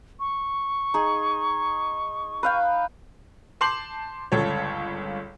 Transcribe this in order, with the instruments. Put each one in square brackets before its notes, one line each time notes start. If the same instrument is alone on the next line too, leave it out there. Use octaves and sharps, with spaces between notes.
[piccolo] C#6
[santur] D#4 G#4
B4 F5 G5
[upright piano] A5 C6 D6 G6 C7 F#7
G1 C#2 A4 C#5